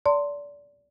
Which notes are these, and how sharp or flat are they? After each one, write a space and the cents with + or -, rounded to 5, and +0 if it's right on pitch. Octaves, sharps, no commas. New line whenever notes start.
D5 -25 A5 +40 C6 +0